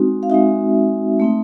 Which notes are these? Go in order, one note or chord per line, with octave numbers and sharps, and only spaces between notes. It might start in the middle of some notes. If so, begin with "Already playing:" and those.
Already playing: G#3 C4 D#4 F#4
F5
G#3 C4 D#4 F#4 E5
A3 C4 D#4